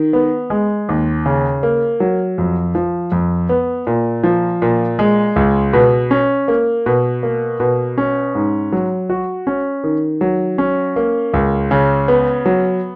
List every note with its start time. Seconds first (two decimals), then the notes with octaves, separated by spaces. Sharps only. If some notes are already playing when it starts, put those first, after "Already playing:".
Already playing: D#3
0.13 B3
0.50 G#3
0.89 D#2
1.26 C#3
1.63 A#3
2.00 F#3
2.38 F2
2.75 F3
3.12 F2
3.49 B3
3.87 A#2
4.24 F3
4.62 A#2
4.99 G#3
5.36 C#2
5.73 B2
6.11 C#4
6.48 A#3
6.86 B2
7.23 A#3
7.60 B2
7.98 C#4
8.35 G#2
8.72 F#3
9.10 F#4
9.47 C#4
9.84 D#3
10.21 F#3
10.58 C#4
10.96 A#3
11.33 C#2
11.71 C#3
12.08 B3
12.46 F#3